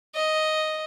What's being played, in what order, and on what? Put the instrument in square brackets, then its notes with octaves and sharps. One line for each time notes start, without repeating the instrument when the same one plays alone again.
[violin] D#5